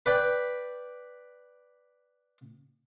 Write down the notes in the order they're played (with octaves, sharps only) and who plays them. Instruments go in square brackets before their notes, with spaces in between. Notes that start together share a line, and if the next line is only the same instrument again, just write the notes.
[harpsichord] B4 D5 G5 B5